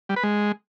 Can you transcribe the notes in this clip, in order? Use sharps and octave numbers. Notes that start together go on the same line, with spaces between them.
G3
B4
G#3